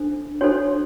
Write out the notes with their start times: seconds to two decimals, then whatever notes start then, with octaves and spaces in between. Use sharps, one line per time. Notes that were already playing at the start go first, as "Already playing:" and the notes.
Already playing: D4 A4 C5
0.41 D4 F#4 A4 C5 C#5